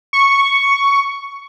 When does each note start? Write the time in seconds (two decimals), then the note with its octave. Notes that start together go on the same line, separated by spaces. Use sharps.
0.13 C#6